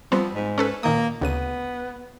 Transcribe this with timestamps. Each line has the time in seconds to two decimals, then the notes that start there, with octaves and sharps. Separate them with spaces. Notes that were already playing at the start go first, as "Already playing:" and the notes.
0.12 F3 G3 B3 C4
0.34 G#2
0.58 C#4 A4 B4
0.83 A#2 D#3 A#3 D#6
1.21 D2 C#3 B3 D#7